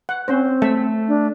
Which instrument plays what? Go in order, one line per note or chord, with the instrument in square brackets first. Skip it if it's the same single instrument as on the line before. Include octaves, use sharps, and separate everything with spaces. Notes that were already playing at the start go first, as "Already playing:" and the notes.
[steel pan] F#5
[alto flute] C4 [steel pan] C#4 C5
[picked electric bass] A3 [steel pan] E5
[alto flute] D4